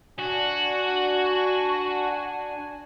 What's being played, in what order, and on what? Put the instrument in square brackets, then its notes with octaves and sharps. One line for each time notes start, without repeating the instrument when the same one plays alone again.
[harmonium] D4 G#5 [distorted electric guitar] F#4